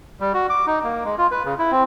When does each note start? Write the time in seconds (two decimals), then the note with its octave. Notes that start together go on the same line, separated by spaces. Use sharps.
0.20 G3
0.34 F#4
0.50 D6
0.67 D#4
0.84 A#3
1.05 G#3
1.18 F4
1.31 B4
1.45 C#3
1.59 E4
1.72 C4